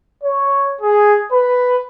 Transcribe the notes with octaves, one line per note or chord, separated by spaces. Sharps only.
C#5
G#4
B4